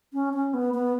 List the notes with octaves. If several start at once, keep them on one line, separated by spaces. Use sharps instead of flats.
C#4
C#4
B3
B3